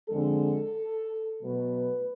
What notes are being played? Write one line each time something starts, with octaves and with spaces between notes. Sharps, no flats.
F2 D3 G#3 A4
B2 F#3 A3 B4